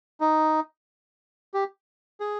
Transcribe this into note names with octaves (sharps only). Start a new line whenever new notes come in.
D#4
G4
G#4